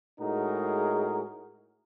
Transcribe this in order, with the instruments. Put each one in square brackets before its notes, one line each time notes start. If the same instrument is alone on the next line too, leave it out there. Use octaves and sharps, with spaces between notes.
[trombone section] A2 G#3 D#4 F#4 G#4 A#4